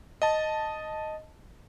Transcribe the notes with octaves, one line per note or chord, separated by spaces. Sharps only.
D#5 A5